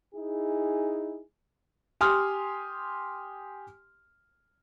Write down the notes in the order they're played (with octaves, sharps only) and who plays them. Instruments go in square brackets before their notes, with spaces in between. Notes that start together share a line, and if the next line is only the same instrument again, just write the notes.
[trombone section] D#4 E4 G#4
[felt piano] G4 G#5 C6 D#6 F6